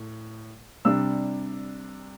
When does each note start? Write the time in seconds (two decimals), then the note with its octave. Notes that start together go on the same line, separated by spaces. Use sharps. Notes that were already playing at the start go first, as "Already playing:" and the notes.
Already playing: A2
0.85 C3 G3 D4 E6